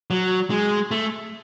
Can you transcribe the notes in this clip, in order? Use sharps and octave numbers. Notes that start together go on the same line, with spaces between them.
F#3
G#3
A3